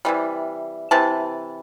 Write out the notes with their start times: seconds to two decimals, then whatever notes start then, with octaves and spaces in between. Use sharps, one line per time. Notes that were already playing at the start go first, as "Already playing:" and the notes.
0.05 C3 E3 G3
0.91 C3 E3 A5